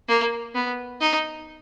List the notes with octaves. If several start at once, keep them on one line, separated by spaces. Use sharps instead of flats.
A#3
B3
D#4